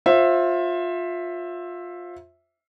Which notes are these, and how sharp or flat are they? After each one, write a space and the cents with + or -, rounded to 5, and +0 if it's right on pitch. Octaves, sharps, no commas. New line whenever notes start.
F4 +20 C5 +20 E5 +0